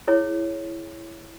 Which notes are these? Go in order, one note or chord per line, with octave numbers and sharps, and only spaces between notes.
E4 G#4 C#5